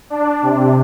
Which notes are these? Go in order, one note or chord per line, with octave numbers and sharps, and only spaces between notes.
D4
C3